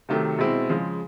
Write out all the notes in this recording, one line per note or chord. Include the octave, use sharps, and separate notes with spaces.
C3 D#3 F#3 A3
B2 G#3 C4 E4
C#3 F3 G#3